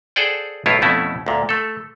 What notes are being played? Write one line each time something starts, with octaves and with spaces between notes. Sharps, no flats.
G#4 A4 C5 D5 F#5 G5
B1 A2 E4 F4 C#5
F2 B2 A3 C#4 E4
D2 A#2
A3 A4